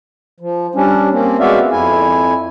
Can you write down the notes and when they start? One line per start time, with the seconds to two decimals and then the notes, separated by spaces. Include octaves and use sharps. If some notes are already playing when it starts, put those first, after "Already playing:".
0.40 F3
0.75 G3 C#4 D4
1.11 A#3 C4 C#4
1.40 G#3 B3 F#4 D5 E5 F5
1.72 F2 E4 G#5